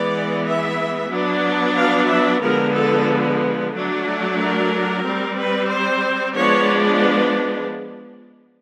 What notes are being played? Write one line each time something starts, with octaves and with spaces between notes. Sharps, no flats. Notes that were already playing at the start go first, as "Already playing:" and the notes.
Already playing: E3 G#3 B3 D5
E5
F#3 B3 D4
F5
E5
D3 F3 G#3 B3 A#4
A4
F#3 A3 D4
A#4
G3 C4
B4
C5
F3 G#3 B3 D4 C#5